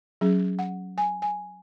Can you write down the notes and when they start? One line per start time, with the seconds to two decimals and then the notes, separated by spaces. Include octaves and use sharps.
0.21 F#3 C#4 G#4
0.59 F#5
0.98 G#5
1.22 G#5